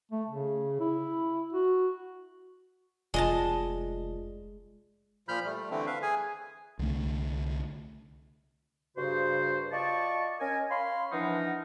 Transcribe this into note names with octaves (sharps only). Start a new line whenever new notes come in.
A3
C#3
E4
F#4
F1 G#3 F4 D5 D#5 A5 G7
A#2 F3 B5 F6 G6
G3 A3
D3 E3 A3 C4
B4 E5 F5
G#4 G#5
C2 D3 A3
G2 C#3 F#4 C5
F4 D5 D#5 A5 C#6
C#4 A#4 D#5 G#5
C#5 F5 B5 C6
E3 F3 D4 D#4 A#4 F#5